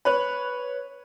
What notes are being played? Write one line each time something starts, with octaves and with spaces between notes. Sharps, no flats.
B4 C#5 F#6